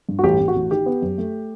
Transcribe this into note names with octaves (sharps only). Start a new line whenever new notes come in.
G2
F#4
A1 G4
A1
F#4
A1
D#3 G4
B3
F#2
A3